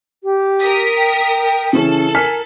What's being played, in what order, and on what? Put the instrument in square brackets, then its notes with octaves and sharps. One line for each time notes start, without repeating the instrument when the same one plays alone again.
[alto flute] G4
[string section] A#4 D#6 B6
[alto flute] G5
[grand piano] C#3 E3 C#4 [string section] A4
[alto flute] A#4 [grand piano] G#5 F6 B6